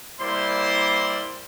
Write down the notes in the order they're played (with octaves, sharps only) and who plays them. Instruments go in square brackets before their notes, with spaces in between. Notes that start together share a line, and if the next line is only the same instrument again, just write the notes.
[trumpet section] G3 A#3 E4 C5 D5 C6